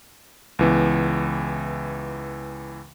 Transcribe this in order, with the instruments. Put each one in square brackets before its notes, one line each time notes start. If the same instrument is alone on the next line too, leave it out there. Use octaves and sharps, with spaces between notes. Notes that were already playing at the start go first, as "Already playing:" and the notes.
[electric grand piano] C#2 E3 B3